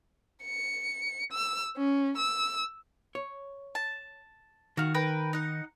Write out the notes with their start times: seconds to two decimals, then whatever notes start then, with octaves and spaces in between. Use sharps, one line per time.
0.43 C#7
1.32 E6
1.77 C#4
2.18 E6
3.15 C#5
3.75 A5
4.77 D#3 F#4 F5
4.94 A#4 B4 G5
5.33 D#4 F#5